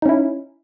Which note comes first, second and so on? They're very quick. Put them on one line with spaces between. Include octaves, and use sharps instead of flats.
D#4 C#4 E4